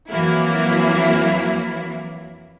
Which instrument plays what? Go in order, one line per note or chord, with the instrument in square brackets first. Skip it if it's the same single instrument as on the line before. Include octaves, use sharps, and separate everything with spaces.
[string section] F2 E3 F#3 A#3 E4